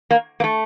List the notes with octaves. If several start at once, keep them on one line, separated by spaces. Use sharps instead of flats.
A#3
A#3
A3